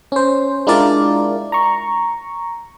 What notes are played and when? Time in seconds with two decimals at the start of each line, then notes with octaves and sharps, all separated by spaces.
0.12 C#4 C5
0.67 G#3 D4 E4 F4 A#4 D5
1.52 A#5 C#6